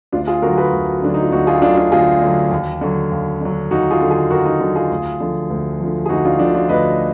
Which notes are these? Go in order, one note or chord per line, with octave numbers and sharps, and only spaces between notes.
D2 D4 F4
F4 G#4
D3 F#3 F#4 A#4
G#4 B4
D2
D3 F#3 D4
D#4
F4
D2 D#4 F#4
F4 G#4
D3 F#3 D4 F4
D4 F4
D2 F4 G#4
D3 F#3
D#2
D3 F#3
D#2
D3 F#3
D#2 D#4 F#4
F4 G#4
D3 F#3
F4 G#4
D#2 F#4 A#4
D#4 F#4
D3 F#3
F4 G#4
D2
D3 F3
D2
D3 F3
G#4
D2 D#4 F#4
D4 F4
D3 F3 D4
D4 F4
D2 B4 D#5